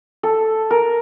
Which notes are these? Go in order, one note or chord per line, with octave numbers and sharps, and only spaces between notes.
A4
A#4